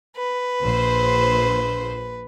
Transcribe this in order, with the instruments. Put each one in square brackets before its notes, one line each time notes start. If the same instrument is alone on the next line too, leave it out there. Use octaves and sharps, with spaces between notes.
[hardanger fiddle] B4
[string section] A#1 C5